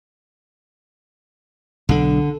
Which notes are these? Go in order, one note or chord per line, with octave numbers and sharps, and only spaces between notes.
B1 D3 D4